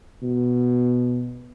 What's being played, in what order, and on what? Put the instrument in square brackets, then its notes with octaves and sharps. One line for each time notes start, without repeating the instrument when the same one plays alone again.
[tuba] B2